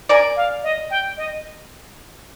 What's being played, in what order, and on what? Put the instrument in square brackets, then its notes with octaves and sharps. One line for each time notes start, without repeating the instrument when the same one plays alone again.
[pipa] A#4 D5 [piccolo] G#5
[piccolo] F5
D#5
G5
D#5